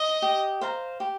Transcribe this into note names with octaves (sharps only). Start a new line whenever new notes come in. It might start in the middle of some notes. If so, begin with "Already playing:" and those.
Already playing: D#5
G4
C5 F5 A#5
G4